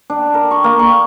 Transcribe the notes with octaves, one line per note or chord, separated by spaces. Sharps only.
D4
A#4
C#6
A#3
C#6